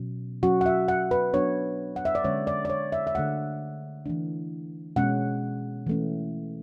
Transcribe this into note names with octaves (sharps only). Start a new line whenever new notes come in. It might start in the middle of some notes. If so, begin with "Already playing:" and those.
Already playing: B2 F#3 C#4
F#3 C#4 F#4
F#5
E5
F#5
B4
F#3 B3 D4 C#5
F#5
E5
D5
D3 G#3 C#4 C#5
D5
D5
C#5
E5
E5
D3 A3 D4 F#5
E3 A3 D4
B2 G#3 C#4 F#5
E3 A3 C#4